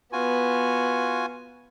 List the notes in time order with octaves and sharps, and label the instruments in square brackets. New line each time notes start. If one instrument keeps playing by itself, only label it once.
[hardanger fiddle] B3 [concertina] F4 F#4 G#5